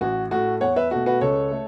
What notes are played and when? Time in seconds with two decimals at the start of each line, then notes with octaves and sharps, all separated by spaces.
0.01 A1 F#4
0.31 A2 A3 F#4
0.61 E2 C#5 F#5
0.76 B4 E5
0.91 B2 A3 F#4
1.06 F#4 B4
1.21 C#2 A4 C#5
1.52 A3